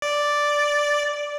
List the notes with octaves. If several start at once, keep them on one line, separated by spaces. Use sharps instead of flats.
D5